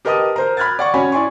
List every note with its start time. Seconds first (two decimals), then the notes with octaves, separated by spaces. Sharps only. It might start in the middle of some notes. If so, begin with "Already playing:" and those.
0.05 G4 A#4 B4 D#5 A5 D#6
0.36 A#4 C5 A#5
0.57 B5 F6 F#6 G#6 A6
0.79 D5 F#5 C#6
0.94 C#4 F#4 C#5 G#5 B5
1.12 E4 D5 G#5 C6 C#6